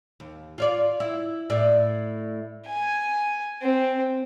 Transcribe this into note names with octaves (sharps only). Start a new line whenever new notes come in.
D#2
F4 C#5 D5
E4
A2 E4 D5
G#5
C4